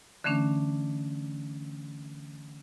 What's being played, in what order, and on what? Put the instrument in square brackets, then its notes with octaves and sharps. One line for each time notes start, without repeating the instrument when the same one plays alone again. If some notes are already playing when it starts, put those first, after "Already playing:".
[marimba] D3 E3 A3 C#4 D4